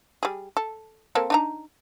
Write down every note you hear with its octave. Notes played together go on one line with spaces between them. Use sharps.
G3 G#4
A4
A#3 C4 A4
D4 D#4 A#5